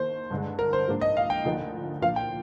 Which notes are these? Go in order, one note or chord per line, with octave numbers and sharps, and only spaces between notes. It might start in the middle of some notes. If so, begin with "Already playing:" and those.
Already playing: D#2 D#3 A#3 C5
G2 D3 G#3
A#4
C5
G#2 F3 A#3 D4
D#5
F5
G5
D2 D3 F3 A#3 D#4
A#2 F3 A#3 D4 F5
G5